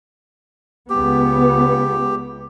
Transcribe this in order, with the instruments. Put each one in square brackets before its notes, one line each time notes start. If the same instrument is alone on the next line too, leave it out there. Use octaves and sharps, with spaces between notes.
[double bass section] C#2 B3 [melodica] G4